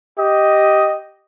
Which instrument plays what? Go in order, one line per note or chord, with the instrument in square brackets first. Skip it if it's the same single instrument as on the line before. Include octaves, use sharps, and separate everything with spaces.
[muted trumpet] G4 [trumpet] D#5